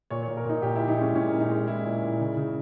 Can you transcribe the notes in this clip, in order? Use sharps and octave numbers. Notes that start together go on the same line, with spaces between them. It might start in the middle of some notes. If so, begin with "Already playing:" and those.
A#2 C#5
C#5
A#2
A#4
A#2 D#4
A#2 G4
A#2 E4
D#4
G#3 C#4
A#2 C#4
A#2
D#4
G#3
G#3 E4
A#2
A#2
C#3
C#3